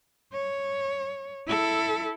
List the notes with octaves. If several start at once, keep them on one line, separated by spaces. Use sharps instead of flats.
C#5
E4 A4